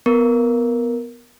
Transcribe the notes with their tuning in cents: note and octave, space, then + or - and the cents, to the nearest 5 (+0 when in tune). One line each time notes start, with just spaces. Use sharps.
B3 +0 A#4 +0